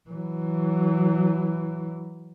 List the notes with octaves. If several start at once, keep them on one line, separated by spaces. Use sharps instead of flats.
E3 F#3